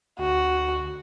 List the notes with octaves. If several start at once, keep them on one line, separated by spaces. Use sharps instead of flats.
D2 F#4